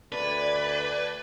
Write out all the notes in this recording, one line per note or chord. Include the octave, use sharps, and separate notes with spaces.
D2 D4 B4 D5 G#6